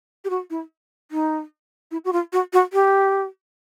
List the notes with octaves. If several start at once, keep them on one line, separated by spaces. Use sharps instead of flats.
G4
F#4
E4
D#4
E4
F#4
F4
F#4
F#4
G4